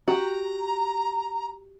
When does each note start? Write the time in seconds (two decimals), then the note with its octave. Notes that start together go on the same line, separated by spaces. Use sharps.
0.08 F#4 G4 A#5